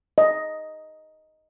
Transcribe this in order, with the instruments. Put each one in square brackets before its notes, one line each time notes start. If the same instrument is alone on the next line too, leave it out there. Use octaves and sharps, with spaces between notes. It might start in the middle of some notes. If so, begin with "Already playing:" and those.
[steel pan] D#5